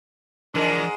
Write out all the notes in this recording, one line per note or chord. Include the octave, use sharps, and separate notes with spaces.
G#2 E3 F3 G#3 D4 A#4